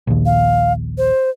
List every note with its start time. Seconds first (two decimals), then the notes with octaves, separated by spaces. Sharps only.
0.07 A#1 D#2
0.26 F5
0.98 C5